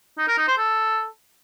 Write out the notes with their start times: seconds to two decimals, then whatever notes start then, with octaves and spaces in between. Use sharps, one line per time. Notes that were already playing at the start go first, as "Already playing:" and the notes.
0.18 D#4
0.28 A#4
0.38 D#4
0.48 C5
0.58 A4